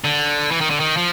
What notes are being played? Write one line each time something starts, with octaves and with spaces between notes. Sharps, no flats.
D3
E3
D#3
D3
D#3
F3